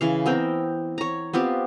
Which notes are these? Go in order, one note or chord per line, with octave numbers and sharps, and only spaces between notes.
C#3 E3 F5
B3 C4 A#4 G5
C#5 A#5
B3 C4 F4 G4